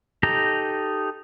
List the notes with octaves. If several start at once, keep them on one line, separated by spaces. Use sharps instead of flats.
D#4 G4 A4 A#5